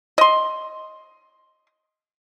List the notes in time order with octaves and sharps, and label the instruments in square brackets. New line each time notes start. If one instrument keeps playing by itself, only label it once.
[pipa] D#5 C6